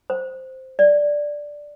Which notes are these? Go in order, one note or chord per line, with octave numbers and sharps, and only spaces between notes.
C5
D5